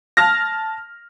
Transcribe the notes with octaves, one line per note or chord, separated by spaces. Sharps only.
A5 F6 A#6